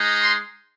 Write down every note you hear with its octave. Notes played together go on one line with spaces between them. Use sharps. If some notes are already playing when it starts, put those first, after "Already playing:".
Already playing: G#3 D#4
C6